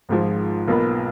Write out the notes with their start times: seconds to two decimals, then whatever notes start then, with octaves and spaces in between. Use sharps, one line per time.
0.09 G#1 G#2 F3
0.68 B1 B2 A#3 F4 B4